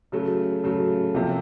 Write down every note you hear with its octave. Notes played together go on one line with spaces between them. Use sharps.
C#3 F#3 A3
C#3 F#3 A3
C3 F3 A#3